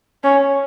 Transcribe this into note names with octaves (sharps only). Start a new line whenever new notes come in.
C#4